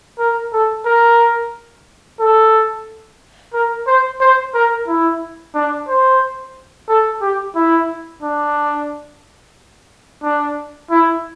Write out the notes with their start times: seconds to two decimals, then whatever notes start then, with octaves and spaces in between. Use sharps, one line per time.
0.19 A#4
0.53 A4
0.85 A#4
2.20 A4
3.54 A#4
3.87 C5
4.20 C5
4.55 A#4
4.88 E4
5.55 D4
5.88 C5
6.89 A4
7.22 G4
7.56 E4
8.23 D4
10.23 D4
10.91 E4